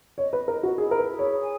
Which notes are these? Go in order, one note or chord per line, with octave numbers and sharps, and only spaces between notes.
C#5 D#5
B4
E4 A#4
F#4
E4 G#4
A#4
B4
G#4
C#5
G#5